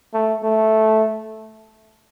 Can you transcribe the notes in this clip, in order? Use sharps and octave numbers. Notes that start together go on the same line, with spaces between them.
A3
A3